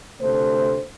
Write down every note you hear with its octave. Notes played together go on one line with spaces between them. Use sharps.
D2 C3 A3 C5